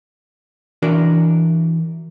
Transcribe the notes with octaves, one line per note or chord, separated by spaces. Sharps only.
E3 D4 F#4 A#4 D5